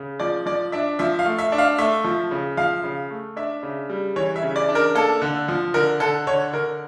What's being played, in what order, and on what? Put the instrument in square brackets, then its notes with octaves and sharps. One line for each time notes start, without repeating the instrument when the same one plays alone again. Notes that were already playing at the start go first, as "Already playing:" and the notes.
Already playing: [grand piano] C#3
F3 D5
F3 D5
D4 E5
F3 E5
F5
A3
E5
D4
F5
A3 E5
F3
C#3
F3 F5
C#3
A3
D4 E5
C#3
G3
E3 C#5
E5
C#3
D5
D4
A#4
A#3 A4
D3
F3
D3 A#4
D3 A4
D3 C#5
D3 A#4